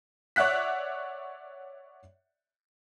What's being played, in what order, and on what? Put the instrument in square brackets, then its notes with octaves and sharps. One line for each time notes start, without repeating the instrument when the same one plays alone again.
[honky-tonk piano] C#5 D5 E5 F#5 F#6 B6